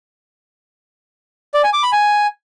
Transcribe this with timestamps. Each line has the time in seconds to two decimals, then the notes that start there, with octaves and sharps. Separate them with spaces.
1.54 D5
1.64 G#5
1.73 D6
1.83 B5
1.92 G#5